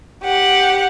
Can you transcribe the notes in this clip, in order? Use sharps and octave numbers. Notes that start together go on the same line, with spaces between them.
G4 F#5